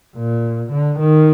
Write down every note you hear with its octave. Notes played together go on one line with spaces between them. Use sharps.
A#2
D3
D#3